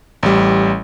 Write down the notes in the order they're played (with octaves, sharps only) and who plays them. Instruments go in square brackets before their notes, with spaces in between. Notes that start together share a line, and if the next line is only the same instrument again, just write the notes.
[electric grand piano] A1 G3